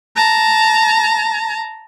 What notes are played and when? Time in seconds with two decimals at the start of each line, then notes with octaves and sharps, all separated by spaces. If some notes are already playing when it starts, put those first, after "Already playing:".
0.16 A5 A#5